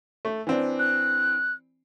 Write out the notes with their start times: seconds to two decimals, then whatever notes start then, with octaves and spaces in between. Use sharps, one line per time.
0.25 A3
0.47 E3 C4 D4
0.79 F#6